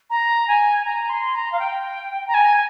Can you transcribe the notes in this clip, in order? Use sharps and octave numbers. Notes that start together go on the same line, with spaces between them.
A#5
G#5
A#5
C6
A#5
F5
G5
A#5
G#5